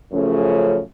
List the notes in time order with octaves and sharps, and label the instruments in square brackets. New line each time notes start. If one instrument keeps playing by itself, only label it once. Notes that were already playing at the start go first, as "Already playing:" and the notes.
[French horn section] F#2 C#3 F3 A3 C#4